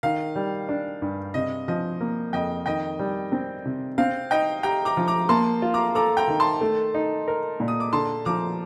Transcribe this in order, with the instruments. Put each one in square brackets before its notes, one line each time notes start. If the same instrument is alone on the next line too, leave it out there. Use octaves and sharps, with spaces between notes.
[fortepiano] D#3 [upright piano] F5
[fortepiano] G3
D4
G2
[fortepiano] C3 [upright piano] D#5
[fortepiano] F3 [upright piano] D#5
[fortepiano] A#3
[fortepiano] F2 [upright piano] D#5 G5
[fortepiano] D#3 [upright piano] D#5 G5
[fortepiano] G3
C4
C3
[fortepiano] C4 [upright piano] F5
[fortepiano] D#4 [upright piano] D#5 G5
[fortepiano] G4 [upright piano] G5 A#5
[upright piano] A#5 D6
[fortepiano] F3
[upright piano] A#5 D6
[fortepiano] A#3 [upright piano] A5 C6
[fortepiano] F4
[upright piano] A#5 D6
[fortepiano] A4 [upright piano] A#5 D6
[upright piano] G5 A#5
[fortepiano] D#3
[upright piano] A5 C6
[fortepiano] A3
D#4
A#4
A#2
[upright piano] D#6
D6
[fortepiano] D3 [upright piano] A5 C6
[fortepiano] F3 [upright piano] A#5 D6